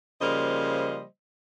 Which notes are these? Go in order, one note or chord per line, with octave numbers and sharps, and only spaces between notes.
C#3 F3 G3 A#3 C5 D#5